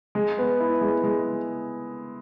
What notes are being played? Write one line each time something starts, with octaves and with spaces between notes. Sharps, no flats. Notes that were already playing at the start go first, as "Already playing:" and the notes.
G#3
B3
E4
G#3
G#3